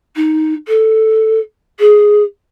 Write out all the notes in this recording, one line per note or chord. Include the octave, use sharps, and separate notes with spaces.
D#4
A4
G#4